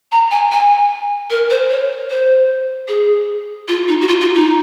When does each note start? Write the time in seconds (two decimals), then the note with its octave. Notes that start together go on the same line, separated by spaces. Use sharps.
0.12 A#5
0.31 G#5
0.51 G#5
1.30 A#4
1.50 C5
1.70 C#5
2.10 C5
2.88 G#4
3.68 F4
3.88 D#4
4.01 F#4
4.08 F4
4.21 F4
4.35 D#4